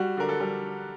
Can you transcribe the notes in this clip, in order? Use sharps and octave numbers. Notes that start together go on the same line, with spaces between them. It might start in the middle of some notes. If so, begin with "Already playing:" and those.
Already playing: G3 F#4
D3 A#4
A4
G3